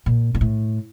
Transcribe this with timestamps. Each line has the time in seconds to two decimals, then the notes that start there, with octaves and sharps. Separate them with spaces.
0.06 A#2
0.35 A#2
0.41 A2